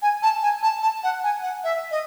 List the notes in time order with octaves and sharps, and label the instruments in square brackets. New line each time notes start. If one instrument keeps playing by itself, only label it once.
[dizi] G#5
A5
G#5
A5
A5
F#5
G#5
F#5
E5
D#5